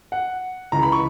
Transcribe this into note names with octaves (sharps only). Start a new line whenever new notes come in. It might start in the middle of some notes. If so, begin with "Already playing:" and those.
F#5
C#2 C#3 E3 A#5
B5
C#6